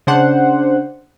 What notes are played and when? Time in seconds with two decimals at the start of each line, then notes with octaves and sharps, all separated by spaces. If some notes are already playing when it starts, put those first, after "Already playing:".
0.07 C#3 D4 C5 F#5